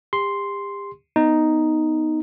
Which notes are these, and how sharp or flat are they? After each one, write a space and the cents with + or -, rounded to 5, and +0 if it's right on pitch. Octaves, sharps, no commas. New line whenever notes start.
G4 +40 C6 +0
B3 +0 D#4 +0